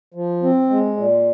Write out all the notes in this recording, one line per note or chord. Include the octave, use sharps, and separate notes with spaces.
F3
C4
G#3
A#2